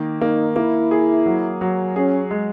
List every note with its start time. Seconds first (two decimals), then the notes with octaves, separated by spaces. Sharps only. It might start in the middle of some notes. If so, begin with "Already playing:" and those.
Already playing: D#3 A#3
0.21 A#3 D#4
0.56 A#3 E4
0.91 G#4
1.26 F#3
1.61 F#3
1.96 C#4 G#4
2.31 G#3